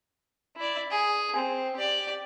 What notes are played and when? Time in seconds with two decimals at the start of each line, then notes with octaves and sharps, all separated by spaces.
0.56 E4 D5
0.91 G#4
1.36 C4
1.76 G4 D5